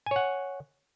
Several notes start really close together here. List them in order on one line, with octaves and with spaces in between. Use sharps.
G#5 C#5 F#5